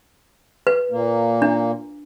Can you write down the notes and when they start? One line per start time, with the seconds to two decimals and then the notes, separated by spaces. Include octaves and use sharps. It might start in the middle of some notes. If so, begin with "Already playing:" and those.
0.67 B4
0.91 A#2 A#3
1.42 D4